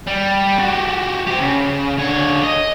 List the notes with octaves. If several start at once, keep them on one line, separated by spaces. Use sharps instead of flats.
G3
F#4 G4
G4 C5
C#3
D3 C#5
D#5